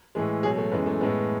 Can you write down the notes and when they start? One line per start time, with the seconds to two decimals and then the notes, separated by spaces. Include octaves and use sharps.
0.15 A2 E3 G#3
0.43 B2 F#3 G#4
0.58 A3
0.72 F#2 E3 G#3 B3
0.86 A3
1.01 A2 G#3 B3